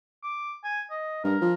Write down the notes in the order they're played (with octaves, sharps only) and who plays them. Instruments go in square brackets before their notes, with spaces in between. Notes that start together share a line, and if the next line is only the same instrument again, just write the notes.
[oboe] D6
G#5
D#5
[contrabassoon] G2 [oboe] A#4
[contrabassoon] F3